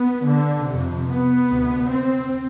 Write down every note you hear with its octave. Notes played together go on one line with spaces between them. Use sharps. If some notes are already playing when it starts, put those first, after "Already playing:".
Already playing: B3
D3
C3
F2
B3
D2 C3
C4